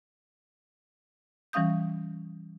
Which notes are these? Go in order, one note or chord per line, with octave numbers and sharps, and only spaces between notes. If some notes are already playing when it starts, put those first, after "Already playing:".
E3 G3 C#4 F5 D#6 G6